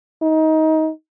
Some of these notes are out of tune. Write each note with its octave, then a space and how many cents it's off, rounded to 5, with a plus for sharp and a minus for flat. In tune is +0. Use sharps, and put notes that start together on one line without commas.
D#4 +20